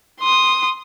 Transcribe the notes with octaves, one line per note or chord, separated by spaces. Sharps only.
C6 D#6